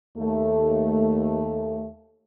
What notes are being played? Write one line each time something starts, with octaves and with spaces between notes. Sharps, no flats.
D#2 A3